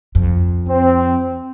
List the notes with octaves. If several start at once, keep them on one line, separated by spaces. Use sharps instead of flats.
F2
C4